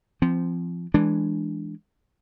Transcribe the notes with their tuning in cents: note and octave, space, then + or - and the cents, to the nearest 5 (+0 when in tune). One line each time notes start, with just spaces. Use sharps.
F3 -20 C4 -10
E3 +0 G#3 +0 D4 +0